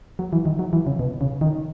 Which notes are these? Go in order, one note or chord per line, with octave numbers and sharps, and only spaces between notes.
F#3
E3
D#3
F#3
E3
C#3
B2
C#3
D#3